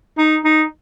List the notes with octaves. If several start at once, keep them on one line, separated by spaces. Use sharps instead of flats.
D#4
D#4